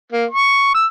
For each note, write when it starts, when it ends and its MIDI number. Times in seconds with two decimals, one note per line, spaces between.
0.12 0.25 58
0.31 0.70 85
0.74 0.86 88